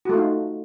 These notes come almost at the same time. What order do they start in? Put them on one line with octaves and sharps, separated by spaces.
F#4 A3 F4 D#4